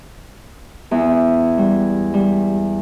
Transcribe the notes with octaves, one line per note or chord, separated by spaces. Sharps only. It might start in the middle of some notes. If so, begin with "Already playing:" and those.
E2
G3
G3